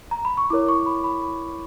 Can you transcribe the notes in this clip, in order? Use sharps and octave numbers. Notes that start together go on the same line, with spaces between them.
A#5
B5
C#6
E4 A#4 C#5 D6
C#6
B5
B5
B5